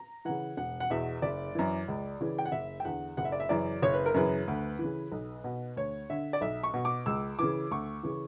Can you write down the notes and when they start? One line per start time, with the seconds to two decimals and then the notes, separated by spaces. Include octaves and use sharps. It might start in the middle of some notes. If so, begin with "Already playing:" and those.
Already playing: A#5
0.25 C#3 E3 F#5
0.57 E1 F#5
0.80 F#5
0.90 E2 B2 E5
1.22 F#1 D5
1.55 F#2 E3
1.88 C#2
2.21 C#3 E3
2.38 G5
2.45 F#5
2.52 F#1 E5
2.80 G5
2.85 E2 D3 F#5
3.17 F#1 F#5
3.25 E5
3.32 D5
3.40 E5
3.49 F#2 C#3 E3 D5
3.82 F#1 C#5
3.94 B4
4.06 A#4
4.14 F#2 C#3 E3 B4
4.48 D2
4.79 C#3 E3
5.12 B1
5.44 B2
5.76 D2 C#5
6.10 D3 E5
6.33 D5
6.41 B1 E5
6.63 C#6
6.74 B2
6.85 D6
7.06 C#2 E6
7.39 C#3 E3 D6
7.71 D2 C#6
8.03 C#3 E3